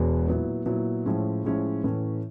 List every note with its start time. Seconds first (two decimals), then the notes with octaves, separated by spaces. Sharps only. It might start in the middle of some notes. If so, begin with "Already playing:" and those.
Already playing: E1 E2 B2 G#3 B3
0.27 A#2 F#3 B3 E4
0.66 A#2 F#3 B3 E4
1.06 A2 F3 G#3 C#4 E4
1.44 A2 F3 G#3 C#4 E4
1.84 A2 E3 A3 C#4